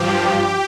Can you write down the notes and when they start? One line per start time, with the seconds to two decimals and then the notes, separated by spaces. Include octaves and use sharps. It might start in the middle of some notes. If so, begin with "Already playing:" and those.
Already playing: G2 F3 G4